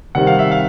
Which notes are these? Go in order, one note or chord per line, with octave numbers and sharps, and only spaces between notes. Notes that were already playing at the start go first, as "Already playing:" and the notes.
C3 D#3 G3 F#5
F5
E5
F5